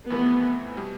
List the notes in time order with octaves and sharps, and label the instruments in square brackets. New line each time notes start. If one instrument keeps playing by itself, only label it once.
[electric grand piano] F2 C3 E3 A3 [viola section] B3
[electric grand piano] B2 G3